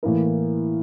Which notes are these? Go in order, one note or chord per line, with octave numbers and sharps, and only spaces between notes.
A2 E3 A#3 E4 A#4